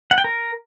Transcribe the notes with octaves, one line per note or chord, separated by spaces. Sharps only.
F#5
G5
A#4